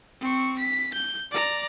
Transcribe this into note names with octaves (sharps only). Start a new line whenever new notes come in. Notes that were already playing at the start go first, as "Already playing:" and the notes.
C4 C#6
B6
G6
D5 A#5